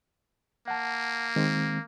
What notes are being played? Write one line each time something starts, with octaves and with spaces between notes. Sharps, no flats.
A#3 F#5 A5
D#3 G#3 C4